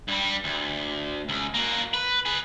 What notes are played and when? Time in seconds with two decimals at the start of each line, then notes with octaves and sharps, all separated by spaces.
0.08 G2 G3
0.44 D2
1.29 C#2
1.54 A#3 F#4
1.94 B4
2.25 G#4 B4